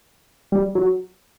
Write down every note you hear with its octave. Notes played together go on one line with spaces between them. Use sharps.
G3
F#3